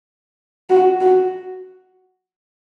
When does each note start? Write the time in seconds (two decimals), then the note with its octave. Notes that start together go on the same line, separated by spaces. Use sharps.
0.70 F#4
1.01 F#4